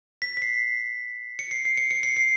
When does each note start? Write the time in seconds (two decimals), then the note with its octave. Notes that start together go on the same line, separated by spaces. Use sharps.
0.22 B6
0.37 B6
0.42 C7
1.39 C#7
1.51 C7
1.65 C7
1.77 C#7
1.91 C#7
2.03 C7
2.16 C7